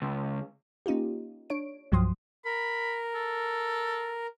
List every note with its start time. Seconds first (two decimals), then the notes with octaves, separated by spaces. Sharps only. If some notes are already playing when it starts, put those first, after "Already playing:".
0.02 C#2
0.86 A#3 C#4 D#4 F4 G4
1.50 D4 C#5 D7
1.92 C2 G2 F3 F#3 C6 D#6
2.45 A#4 B5
3.15 A4